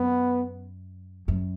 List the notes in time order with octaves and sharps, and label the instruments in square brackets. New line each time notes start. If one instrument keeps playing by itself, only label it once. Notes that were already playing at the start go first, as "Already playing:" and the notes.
Already playing: [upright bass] F#2 [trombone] B3
[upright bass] F#2